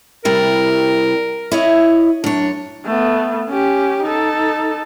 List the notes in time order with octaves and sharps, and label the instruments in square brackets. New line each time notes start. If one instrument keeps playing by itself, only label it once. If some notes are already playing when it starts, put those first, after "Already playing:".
[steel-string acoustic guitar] C3 G3 E4 [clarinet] A#4
[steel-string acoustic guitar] E4 C#5 D#5
[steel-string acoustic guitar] F#2 C#5 [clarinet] D4
[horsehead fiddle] A3 B3
C#4 G4
D#4 A4